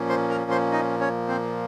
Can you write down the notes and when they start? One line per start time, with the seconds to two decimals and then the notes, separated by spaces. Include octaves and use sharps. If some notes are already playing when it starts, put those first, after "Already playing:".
Already playing: A#2 F3 A#3 C#4
0.09 C5 C6
0.30 A#4 A#5
0.51 C5 C6
0.72 D#4 D#5
1.00 C#4 C#5
1.28 C4 C5